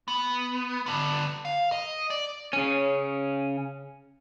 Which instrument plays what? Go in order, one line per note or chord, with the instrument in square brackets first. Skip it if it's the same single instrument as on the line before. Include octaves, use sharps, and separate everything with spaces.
[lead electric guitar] B3
D3 B3
F5
D#5
D5
C#3 C#4